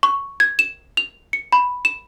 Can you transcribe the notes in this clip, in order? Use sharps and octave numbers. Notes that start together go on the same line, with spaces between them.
C#6
G#6
E7
F7
C#7
B5
E7